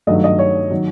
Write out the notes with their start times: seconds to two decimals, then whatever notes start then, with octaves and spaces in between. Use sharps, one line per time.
0.07 G2 D#3 F#3 A3 D#5
0.24 D#5
0.39 C#5
0.70 D#3 F#3